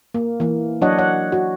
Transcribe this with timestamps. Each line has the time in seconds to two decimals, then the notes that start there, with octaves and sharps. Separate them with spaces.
0.14 A#3
0.40 E3 A#3
0.82 F#3 D4 F#4 C#5 D#5 F#5
0.98 C#5 F#5
1.32 F#4